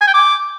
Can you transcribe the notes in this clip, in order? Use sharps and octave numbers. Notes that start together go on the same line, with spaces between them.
G#5
G5
D6